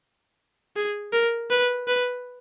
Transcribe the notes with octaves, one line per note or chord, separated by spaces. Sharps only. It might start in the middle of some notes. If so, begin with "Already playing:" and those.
G#4
A#4
B4
B4